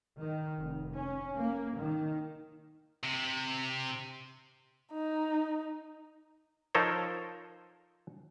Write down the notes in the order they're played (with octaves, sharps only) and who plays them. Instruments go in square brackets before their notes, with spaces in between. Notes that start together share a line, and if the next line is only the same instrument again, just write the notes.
[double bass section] D#3
F1
C#4
A#3
D#3
[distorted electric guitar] C3
[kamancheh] D#4
[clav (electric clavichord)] F3 D#4 A4 A#4 C5 C#5